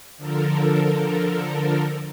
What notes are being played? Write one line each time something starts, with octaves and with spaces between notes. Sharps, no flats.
D3 F3 A4 A#4